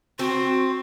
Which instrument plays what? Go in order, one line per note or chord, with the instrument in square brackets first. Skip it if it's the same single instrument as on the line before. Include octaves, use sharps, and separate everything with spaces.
[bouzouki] C4 [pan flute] F#4